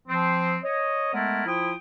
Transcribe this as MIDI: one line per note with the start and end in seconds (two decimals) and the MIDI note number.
0.08 0.57 53
0.08 0.57 60
0.64 1.12 73
0.64 1.12 75
1.14 1.44 56
1.14 1.44 57
1.14 1.44 59
1.14 1.44 64
1.14 1.44 69
1.14 1.44 70
1.46 1.74 53
1.46 1.74 64
1.46 1.74 65
1.46 1.74 79
1.46 1.74 87